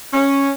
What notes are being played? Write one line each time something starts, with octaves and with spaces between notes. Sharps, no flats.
C#4